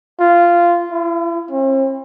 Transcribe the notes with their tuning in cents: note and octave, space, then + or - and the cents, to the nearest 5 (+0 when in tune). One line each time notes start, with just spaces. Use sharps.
F4 -15
E4 +40
C4 +45